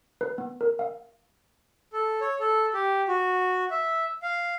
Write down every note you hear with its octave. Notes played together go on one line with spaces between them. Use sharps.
B4
B3
A#4
F5
A4
C#5
A4
G4
F#4
E5
F5